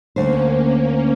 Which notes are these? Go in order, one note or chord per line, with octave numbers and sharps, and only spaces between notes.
D2 A#3 C#4 C5